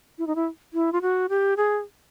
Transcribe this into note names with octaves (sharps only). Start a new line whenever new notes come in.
E4
D#4
E4
E4
F4
F#4
G4
G#4